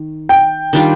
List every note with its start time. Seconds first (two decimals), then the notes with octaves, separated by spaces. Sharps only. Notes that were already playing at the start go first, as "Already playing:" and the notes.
Already playing: D#3
0.29 G5
0.73 D#3 G3 D4 F4